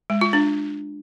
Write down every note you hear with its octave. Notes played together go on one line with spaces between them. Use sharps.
G#3
F4
D4